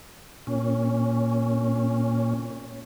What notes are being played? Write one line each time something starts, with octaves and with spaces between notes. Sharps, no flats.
A#2 C#4